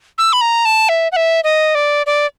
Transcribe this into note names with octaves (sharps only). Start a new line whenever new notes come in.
E6
B5
A#5
A5
E5
F#5
E5
D#5
D5
D5